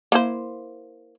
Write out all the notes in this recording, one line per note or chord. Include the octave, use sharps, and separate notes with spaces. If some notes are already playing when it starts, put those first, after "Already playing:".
A#3 E4 C5